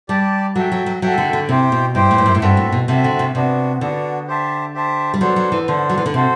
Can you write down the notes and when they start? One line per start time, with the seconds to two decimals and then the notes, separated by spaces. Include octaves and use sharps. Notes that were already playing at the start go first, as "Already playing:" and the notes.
0.09 G3 G4 D5 A5
0.55 F#3 F#4 A4 E5 G5
0.72 F#3
0.86 F#3
1.02 F#3 F#4 A4 E5 G5
1.18 D3
1.33 D3
1.48 C3 E4 G4 C5 G5
1.72 B2
1.95 G2 E4 G4 C5 G5
2.11 A2
2.18 G2
2.26 F#2
2.35 A2
2.41 G2 C4 F#4 A4 E5
2.57 A2
2.72 B2
2.88 C3 C4 F#4 A4 E5
3.04 D3
3.19 C3
3.35 C3 B3 D4 F#4
3.81 D3 B3 D4 F#4
4.27 G4 C5 E5 A5
4.74 G4 C5 E5 A5
5.14 G3
5.20 F#3 B3 D4 A4 C5
5.36 F#3
5.52 E3
5.67 D3 B3 D4 A4 C5
5.90 F#3
5.98 E3
6.06 D3
6.14 C3 F#4 A4 C5